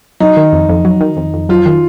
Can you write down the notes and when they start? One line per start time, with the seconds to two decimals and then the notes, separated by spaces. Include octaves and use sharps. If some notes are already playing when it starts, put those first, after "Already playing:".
0.20 F#3 D#4
0.37 D#3
0.53 F2
0.69 F2
0.85 F#3
1.01 D#3
1.17 F2
1.34 F2
1.49 F#3 F4
1.66 D#3